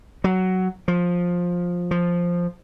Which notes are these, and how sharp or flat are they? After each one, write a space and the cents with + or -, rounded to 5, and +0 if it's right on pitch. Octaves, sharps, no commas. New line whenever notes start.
F#3 +10
F3 +15
F3 +0